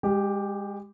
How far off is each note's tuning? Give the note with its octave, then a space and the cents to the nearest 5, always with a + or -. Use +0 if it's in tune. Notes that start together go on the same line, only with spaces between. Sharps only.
G#3 -30 G4 +0